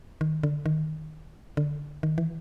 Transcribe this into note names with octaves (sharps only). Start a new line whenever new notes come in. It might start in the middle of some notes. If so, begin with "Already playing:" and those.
D#3
D3
D#3
D3
D#3
E3